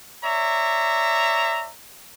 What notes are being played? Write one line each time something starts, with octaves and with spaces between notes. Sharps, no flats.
C#5 D5 E5 A#5